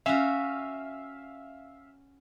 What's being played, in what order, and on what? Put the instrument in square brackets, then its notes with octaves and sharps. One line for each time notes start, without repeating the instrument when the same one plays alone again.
[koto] C#4 F#4 [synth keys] E5 F5